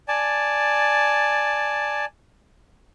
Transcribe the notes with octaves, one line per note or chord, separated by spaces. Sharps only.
D5 G#5 A5